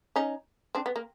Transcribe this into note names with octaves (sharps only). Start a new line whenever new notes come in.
C#4 D#4
C4 D4
B3
A#3